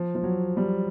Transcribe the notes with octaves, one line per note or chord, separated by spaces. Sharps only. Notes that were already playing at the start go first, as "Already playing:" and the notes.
Already playing: F3
F3
F#3
G3